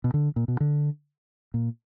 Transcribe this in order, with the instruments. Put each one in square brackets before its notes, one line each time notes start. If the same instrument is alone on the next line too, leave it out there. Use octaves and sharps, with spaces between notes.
[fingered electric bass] B2
D3
A#2
B2
D3
A#2